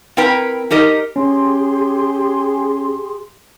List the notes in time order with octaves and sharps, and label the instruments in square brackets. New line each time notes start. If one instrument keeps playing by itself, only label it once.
[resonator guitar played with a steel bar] C4 E4 A#4 B4 G5 A#5
D#4 G4 A#4 D#5
[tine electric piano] C#4 [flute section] G4 G#4 C6